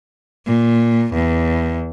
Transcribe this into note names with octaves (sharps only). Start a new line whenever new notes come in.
A#2
E2